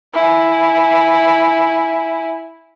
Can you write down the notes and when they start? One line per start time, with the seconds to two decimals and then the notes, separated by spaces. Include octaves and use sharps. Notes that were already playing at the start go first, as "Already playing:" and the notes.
0.14 E4 G#5